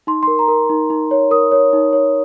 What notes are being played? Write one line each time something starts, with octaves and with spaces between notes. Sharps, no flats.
D#4 C6
A#4 C6
A#5
A#4
D#4
D#4
C#5
A#4 D#6
C#5
D#4
C#5